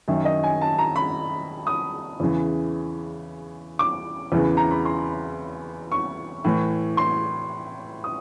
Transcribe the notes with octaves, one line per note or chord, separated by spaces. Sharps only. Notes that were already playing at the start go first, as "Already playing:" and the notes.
F#2 D#3 E5
D#5
G#5
A5
A#5
B5
D#6
E2 C#3 E3
D6
E2 C#3 E3
A#5
B5
C6
C#6
A2 E3
C6
D#6